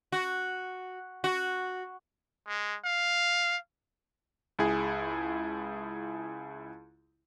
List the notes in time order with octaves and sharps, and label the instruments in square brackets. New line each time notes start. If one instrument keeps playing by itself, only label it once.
[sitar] F#4
F#4
[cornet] G#3
F5
[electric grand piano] C#2 E4 G#4